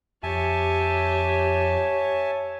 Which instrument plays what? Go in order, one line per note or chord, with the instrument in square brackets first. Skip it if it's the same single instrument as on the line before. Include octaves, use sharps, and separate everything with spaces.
[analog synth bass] F2 [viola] G4 [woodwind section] C#5 [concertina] E5 G#5 A5